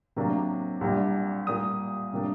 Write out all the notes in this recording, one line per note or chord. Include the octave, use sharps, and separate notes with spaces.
C3 F#3 A#3 D4
C2 A#2 G3 D4
A#2 G3 A#3 D#6
C3 G3 A#3 D4